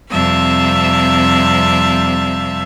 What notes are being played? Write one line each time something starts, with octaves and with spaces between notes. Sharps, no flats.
F2 C3 G3 E5 F5 A5